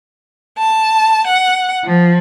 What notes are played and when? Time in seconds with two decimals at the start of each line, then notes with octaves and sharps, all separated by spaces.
0.57 A5
1.27 F#5
1.85 F3